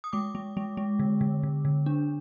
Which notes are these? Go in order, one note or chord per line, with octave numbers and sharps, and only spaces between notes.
D#6
G#3 D6
G#3
G#3
G#3
D3
D3
D3
D3
D4